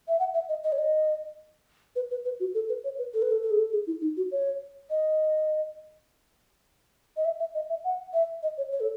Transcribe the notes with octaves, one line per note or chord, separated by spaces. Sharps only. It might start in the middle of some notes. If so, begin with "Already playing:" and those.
E5
F#5
E5
D#5
D#5
C#5
D#5
B4
B4
B4
F#4
A4
B4
C#5
B4
A4
B4
A4
A4
G#4
A4
G#4
E4
D#4
F#4
C#5
D#5
D#5
E5
E5
D#5
E5
F#5
E5
D#5
C#5
C#5
A4